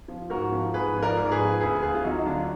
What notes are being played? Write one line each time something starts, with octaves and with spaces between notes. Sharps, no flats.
F3
G#2 F#4 A#4
F3
G#2 G#4 B4
F3
A#4 D5
G#2
G#4 B4
F3
D2 G#4 B4
D2 F4 G#4
F4
F#3 D#4 F#4
D#4
D3 D4 F4